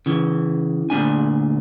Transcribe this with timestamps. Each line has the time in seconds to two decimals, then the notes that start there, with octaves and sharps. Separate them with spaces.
0.06 C#3 E3
0.90 D2 A#2 D4 G#5